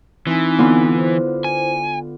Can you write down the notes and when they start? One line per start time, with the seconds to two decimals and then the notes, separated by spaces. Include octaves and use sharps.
0.27 E3 C4 D#4 G#5
0.59 D3 B3 F4
0.95 E4 C5
1.44 G#5